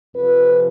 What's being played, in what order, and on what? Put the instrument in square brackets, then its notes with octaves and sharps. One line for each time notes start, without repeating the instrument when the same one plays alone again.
[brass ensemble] F2 C3 F3 B4